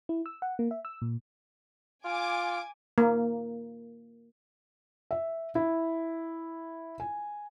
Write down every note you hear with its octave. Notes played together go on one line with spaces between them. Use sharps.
E4
E6
F#5
A#3
E5
E6
A#2
F4 G#5 D6
A#3
E5
E4
G#5